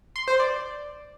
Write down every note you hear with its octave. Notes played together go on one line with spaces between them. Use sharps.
C6
C5
D5